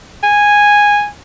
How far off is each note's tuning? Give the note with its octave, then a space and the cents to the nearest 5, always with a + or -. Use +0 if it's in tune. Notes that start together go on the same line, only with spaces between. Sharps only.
G#5 -10